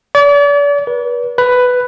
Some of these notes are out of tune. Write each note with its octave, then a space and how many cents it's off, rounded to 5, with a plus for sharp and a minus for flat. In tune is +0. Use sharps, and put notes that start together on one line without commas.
D5 -40
B4 -35
B4 +5